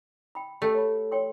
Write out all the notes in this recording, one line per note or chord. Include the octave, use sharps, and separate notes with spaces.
G5 B5
A3 G4 G5
C#5 B5
C#5 G5 C6